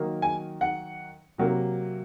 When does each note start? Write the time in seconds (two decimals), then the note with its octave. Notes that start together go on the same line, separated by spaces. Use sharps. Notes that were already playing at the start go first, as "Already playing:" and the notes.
Already playing: D#3 F#3 A#3
0.22 G#5
0.61 F#5
1.38 C3 F#3 A#3